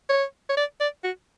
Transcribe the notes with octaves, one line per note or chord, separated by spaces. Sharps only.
C#5
C#5
D5
D5
F#4